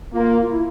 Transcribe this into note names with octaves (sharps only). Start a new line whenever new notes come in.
A#3 F4
F4
E4